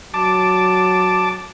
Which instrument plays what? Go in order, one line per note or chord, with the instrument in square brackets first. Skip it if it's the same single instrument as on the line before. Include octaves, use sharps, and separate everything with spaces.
[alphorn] F#3 [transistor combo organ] A5 D6